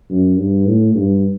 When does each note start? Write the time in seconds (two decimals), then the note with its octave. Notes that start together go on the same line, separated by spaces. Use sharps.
0.10 F#2
0.38 G2
0.66 A2
0.95 G2